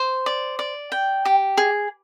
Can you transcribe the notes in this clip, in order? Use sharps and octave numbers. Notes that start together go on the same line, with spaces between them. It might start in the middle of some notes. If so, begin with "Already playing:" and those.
Already playing: C5
D5
D5
G5
G4
G#4